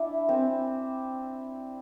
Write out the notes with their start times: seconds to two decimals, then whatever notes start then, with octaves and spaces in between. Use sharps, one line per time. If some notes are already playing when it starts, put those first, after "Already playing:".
Already playing: D4 E4
0.29 C4